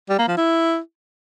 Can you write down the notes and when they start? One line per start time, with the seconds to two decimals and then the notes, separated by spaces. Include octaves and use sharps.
0.09 G3
0.18 A#3
0.28 F3
0.37 E4